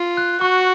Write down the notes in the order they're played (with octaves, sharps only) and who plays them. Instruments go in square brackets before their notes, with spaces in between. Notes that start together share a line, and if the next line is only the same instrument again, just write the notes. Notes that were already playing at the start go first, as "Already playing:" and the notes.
Already playing: [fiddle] F4
[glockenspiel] F#6
[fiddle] F#4 [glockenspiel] C#6